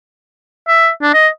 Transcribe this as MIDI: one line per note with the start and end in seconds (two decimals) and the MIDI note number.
0.68 0.89 76
1.02 1.12 62
1.14 1.28 75